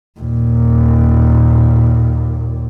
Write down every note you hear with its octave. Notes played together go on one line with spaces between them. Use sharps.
D#2 A#2